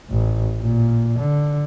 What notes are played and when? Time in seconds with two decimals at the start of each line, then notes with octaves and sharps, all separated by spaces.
0.11 A1
0.61 A#2
1.19 D3